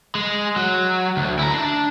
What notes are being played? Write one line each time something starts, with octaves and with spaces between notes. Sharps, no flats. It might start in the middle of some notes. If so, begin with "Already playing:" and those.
G#3
F#3
D2
E4 A#5
D4